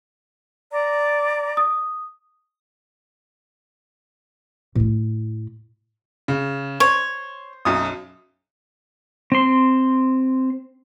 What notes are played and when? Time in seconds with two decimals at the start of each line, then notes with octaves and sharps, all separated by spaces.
0.71 D5 A#5
1.57 D#6
4.75 A2 E4
6.28 C#3
6.80 C5 C#5
7.65 B1 F#2 D#6
9.32 C4 C6